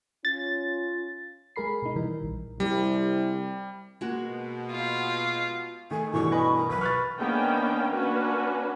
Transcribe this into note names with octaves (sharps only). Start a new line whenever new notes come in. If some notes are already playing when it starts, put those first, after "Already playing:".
C#4 F4 A6
G#3 G#4 A#4 B5 C7
B2 D#4
D#3 E3 G3 A#4
A#1
C2 G3
B2 G#3 A#3 F#4
F4
D#3 A3 G#5
G2 B2 E3 C#6
B4 D#5 G#5
A#4
B1 B4
C#6 F6 F#6 A6
D#3 A#3 B3 C#4 D4 G5
A#3 C#4 D4 F#4 B4